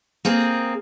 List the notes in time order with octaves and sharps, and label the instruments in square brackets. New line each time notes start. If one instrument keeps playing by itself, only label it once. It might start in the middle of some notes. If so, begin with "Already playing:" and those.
[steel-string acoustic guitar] A#3 C4 G#4